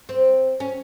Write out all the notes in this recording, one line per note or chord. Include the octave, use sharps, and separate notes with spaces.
C4
C#4